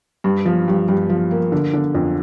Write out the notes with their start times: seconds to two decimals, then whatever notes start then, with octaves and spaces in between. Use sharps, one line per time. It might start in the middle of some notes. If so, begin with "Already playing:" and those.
0.24 G2
0.45 F3
0.68 G2
0.88 G2
1.09 F3
1.31 A#3
1.52 D3
1.73 D3
1.95 F2